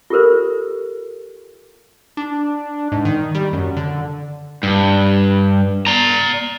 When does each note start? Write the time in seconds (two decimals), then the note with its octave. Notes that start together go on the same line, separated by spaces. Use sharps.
0.10 F4 G4 A4 A#4 C5
2.17 D4
2.92 G#2
3.05 D#3
3.35 G3
3.53 F#2
3.77 D3
4.63 G2
5.87 D5 A#5